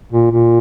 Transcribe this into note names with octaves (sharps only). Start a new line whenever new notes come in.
A#2
A#2